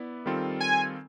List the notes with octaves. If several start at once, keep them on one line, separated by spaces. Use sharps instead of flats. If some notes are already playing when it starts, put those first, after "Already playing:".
Already playing: B3 E4 D5
D#3 G3 C4 F4 A4
G#5